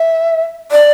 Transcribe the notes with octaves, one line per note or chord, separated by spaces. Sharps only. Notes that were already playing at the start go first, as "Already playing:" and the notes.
Already playing: E5
D5